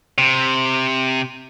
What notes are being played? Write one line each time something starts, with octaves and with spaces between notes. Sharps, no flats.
C3